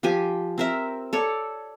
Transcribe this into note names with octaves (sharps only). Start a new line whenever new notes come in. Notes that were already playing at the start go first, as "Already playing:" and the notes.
F3 G4 G5 G#5
C4 A#4 E5
A4 C#5 D5